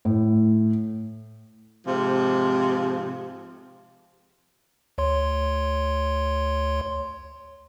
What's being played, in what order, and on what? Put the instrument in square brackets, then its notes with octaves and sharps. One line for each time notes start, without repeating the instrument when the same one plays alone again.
[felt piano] A2
[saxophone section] G#2 C3 F3
[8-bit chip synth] D2 C#5 C6